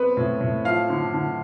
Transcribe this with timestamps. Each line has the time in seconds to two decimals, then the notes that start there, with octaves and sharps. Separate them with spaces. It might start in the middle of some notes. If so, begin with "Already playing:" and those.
Already playing: B3 C4 B4
0.17 A2
0.41 A2
0.65 F3 F5
0.90 D3
1.14 D3